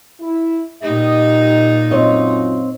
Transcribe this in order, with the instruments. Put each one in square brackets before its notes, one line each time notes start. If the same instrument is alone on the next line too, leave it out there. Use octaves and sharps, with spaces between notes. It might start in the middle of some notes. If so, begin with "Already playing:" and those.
[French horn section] E4
[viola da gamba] A#2 D#4 [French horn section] G4 D#5
[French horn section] F#2 F4 [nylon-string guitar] C4 C#5 D#5